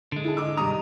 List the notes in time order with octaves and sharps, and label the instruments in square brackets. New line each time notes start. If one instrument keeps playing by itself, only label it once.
[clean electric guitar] D3 G#3
[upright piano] E4 G#4 A5
D#5 D6 E6
[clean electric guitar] C2 D#3 A#5 [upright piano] G2 D#6